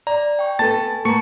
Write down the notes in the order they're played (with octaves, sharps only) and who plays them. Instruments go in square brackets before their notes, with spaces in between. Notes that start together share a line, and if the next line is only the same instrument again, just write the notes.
[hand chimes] D5 [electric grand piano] A#5
[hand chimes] G5 C#6
[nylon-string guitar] B3 A4 B4 [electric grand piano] A5 A6
[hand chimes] G#5
[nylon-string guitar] A#3 B3 [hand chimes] A5 A#5 [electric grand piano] C#6 C#7